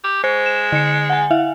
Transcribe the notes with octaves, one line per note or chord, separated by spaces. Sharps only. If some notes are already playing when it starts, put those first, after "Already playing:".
G4
G#3 C5
E7
D3 C#7
F#5 G#5
E4 E5 F5